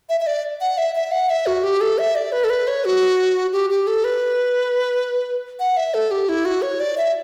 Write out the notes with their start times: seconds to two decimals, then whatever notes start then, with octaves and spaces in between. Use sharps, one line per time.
0.09 E5
0.20 E5
0.27 D5
0.61 F#5
0.78 E5
0.95 E5
1.12 F#5
1.29 E5
1.46 F#4
1.64 G4
1.81 A4
1.98 E5
2.15 D5
2.32 B4
2.44 A4
2.50 B4
2.68 C#5
2.85 F#4
3.53 G4
3.70 G4
3.87 A4
4.04 B4
5.59 F#5
5.77 E5
5.94 A4
6.11 G4
6.29 E4
6.45 F#4
6.62 C#5
6.80 D5
6.97 E5